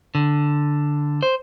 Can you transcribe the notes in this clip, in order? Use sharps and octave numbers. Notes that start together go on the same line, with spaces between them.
D3
C5